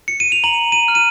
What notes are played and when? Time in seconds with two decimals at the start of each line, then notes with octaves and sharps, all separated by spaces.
0.08 C#7
0.20 D#7
0.32 F7
0.44 A#5 F#7
0.72 D#7
0.88 F6
0.95 D#7